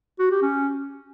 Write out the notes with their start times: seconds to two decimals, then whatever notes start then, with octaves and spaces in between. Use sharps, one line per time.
0.19 F#4
0.31 G4
0.42 C#4